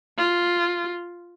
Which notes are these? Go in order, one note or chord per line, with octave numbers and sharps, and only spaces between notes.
F4